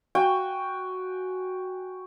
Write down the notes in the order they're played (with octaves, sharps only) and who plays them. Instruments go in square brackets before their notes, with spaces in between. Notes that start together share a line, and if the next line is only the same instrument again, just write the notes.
[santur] F#4 G5 G#5